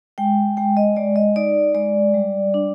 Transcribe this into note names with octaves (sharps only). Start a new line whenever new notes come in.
G#3 G5
G#3 G5
D#5
G#3 D5
D#5
D#4 D5
G#3 D5
G3
D4